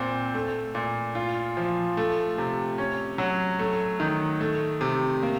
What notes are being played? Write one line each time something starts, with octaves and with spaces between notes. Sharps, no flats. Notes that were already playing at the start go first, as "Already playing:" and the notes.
Already playing: A#2 C4
A3
A#2
F4
F3
A3
C3
C#4
F#3
A3
D#3
A3
C3
A#3